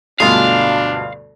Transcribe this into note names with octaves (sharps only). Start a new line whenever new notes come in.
D2 G2 B2 G#3 D4 F4 F5